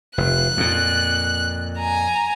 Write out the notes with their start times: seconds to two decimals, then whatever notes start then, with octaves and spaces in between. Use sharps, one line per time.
0.18 F1 F#6
0.57 F2 A#2
1.79 G#5 A#5